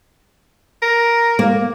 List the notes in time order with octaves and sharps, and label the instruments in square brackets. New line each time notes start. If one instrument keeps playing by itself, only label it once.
[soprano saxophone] A#4
[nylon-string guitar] A#3